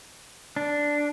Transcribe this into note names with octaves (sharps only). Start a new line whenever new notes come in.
D4